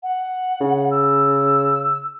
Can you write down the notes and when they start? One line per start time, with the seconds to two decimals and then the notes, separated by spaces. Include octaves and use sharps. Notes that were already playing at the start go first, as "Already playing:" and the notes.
0.03 F#5
0.61 C#3
0.91 E6